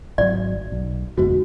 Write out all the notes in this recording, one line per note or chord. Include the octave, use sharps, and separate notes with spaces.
G#1 D#3 F#3 D5
B1
F#1 E2 G#2 F#4